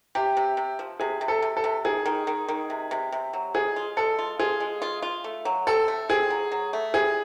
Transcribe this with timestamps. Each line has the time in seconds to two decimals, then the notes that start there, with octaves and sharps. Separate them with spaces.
0.15 C3 G4
0.37 C3
0.57 C3
0.79 F3
1.00 C3 G#4
1.21 C3
1.28 A4
1.42 C3
1.57 A4
1.64 C3
1.85 D#3 G#4
2.06 D#3
2.27 D#3
2.48 D#3
2.70 C3
2.91 C3
3.12 C3
3.33 F#3
3.54 G#3 G#4
3.76 F4
3.97 G#3 A4
4.19 F4
4.39 F4 G#4
4.60 G#3
4.82 F4
5.02 F4
5.24 A3
5.45 F#3
5.67 C4 A4
5.88 A3
6.09 C4 G#4
6.30 F#3
6.52 F#3
6.73 A3
6.94 G3 G#4